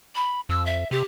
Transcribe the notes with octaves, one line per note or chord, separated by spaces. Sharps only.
B5
F2 E6
E5
C3 G4